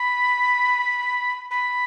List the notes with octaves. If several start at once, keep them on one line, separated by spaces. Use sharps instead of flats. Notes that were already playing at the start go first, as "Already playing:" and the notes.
Already playing: B5
B5